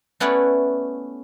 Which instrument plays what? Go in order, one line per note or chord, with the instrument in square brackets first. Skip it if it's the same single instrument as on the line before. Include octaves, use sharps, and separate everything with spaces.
[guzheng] A3 B3 C#4 E4 D5 F#5